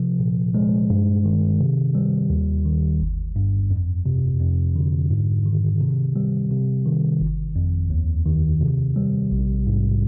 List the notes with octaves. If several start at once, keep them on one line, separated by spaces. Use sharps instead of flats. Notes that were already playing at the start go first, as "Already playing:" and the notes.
Already playing: C3 F3
A#2
G#3
G2
D#3
C3
G3
D#2
D#3
G1
G2
F2
C3
F2
D3
G#2
D#3
C3
G3
C3
D#3
G1
F2
D#2
D#3
C3
G3
A#1
G#2